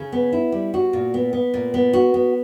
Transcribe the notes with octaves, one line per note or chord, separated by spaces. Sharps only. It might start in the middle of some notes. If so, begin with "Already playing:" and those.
Already playing: C#3
B3
E4
G3
F#4
A#2
B3
B3
A#2
B3
F#4
B3